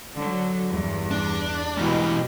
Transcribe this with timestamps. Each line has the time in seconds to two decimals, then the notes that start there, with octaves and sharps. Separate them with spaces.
0.14 D3 F#3
0.73 E2 G2
1.11 D4
1.77 G#2 B2 E3 G4